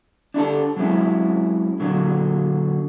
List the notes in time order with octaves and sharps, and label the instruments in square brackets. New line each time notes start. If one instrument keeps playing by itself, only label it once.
[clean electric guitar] D4 E4 G4 A4
F#3 G#3 C4 C#4 E4
A#2 D3 F#3 F#4